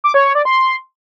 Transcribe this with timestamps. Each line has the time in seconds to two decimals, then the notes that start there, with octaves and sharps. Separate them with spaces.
0.04 D6
0.14 C#5
0.25 C#5
0.35 D5
0.45 C6